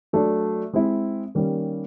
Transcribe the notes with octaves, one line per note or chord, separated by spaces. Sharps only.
F#3 A3 D4
G#3 C4 E4
D#3 G3 A#3 C#4